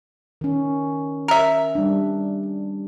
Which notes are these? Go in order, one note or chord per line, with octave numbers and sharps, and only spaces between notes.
D#3 C#4
A#4 E5
G3 D4